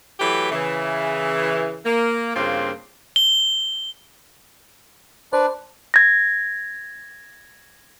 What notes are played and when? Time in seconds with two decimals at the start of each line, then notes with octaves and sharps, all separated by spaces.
0.20 E3 F#3 A3 G4 B4
0.52 C#3 E3
1.86 A#3
2.36 G2 C#3 A#3 C4 F4
3.16 G7
5.33 D4 B4 C5 D5
5.94 G#6 A#6